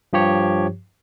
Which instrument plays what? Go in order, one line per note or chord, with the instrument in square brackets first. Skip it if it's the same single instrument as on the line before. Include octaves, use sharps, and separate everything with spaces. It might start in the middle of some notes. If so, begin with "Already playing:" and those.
[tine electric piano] G2 F3 G4 C#5